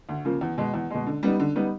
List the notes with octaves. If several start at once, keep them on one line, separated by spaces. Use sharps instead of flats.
D2
C#3 F3 A#3
E2
B2 G#3
E2
B2 G#3
D3
G3 B3 D#4
D3
G3 B3 D#4